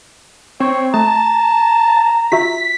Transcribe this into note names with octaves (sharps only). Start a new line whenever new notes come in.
C4 C#5
A3 A5 A#5
F4 F#4 E5 B6